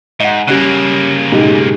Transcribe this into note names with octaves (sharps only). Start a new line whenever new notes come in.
G#2 D#5 F#5
C#3 G3 A#3 C#4 F#6
B1 G#2 G4